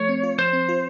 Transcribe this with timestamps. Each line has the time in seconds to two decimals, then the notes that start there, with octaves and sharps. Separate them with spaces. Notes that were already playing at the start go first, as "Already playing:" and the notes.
Already playing: F3 A3 C#5
0.09 C4
0.23 F4
0.39 F3 C5
0.53 C4
0.69 F4